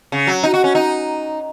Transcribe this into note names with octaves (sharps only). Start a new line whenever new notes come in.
C#3
F#3
D#4
F#4
C#4
D#4